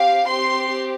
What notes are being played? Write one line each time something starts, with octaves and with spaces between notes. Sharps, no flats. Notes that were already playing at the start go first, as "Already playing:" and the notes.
Already playing: C4 G4 F5
C4 G4 C6